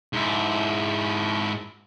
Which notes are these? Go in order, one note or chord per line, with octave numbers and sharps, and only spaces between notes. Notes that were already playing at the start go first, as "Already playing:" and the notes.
G#2 E4